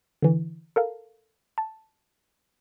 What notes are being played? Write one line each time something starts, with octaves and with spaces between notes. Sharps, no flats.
D3 E3
A4 A#4 F5
A5